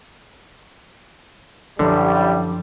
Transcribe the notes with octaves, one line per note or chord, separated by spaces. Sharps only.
A1 F#2 D3 F3 G3